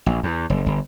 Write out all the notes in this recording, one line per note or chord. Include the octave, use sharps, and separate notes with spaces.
A#1
E2
F#1
G1